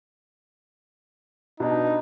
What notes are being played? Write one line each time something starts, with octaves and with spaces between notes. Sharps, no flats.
B2 D4 D#4